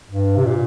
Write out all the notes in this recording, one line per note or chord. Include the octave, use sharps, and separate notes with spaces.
G2
C3
A#2